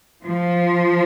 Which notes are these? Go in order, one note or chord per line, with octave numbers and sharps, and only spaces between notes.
F3